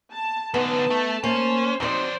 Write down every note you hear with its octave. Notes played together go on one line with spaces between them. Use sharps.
A5
F#2 D3 B3 D#4 A5
A3
A#3 C#4 C5
F2 F#3 C4 D#4 C5 D5